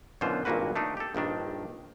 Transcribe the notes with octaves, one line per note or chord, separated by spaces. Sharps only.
F#2 B2 D3 E3 F4 C5
G#1 G2 A#2 A#3 F#4 B4
A3 D4 D#4
G4 A4
A#1 G2 D#3 D4